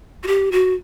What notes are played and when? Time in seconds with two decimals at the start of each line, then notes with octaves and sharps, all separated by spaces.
0.24 F#4
0.27 G4
0.52 F#4